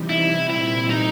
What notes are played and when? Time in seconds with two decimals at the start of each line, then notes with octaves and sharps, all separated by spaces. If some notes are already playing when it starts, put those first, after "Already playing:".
Already playing: C3 E3 G3 C4 D#4
0.09 E4
0.49 A#2 G3 C4 E4
0.90 D#4